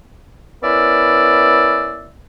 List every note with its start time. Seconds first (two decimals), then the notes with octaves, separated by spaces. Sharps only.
0.63 B3 C#4 E4 A#4 D5 E5